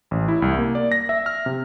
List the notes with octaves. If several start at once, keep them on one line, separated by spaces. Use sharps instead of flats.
A1
E4
C2
A#3
D5
A#6
E5
F6
C3